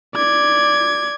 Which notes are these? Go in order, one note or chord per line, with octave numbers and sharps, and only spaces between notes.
D5 G#6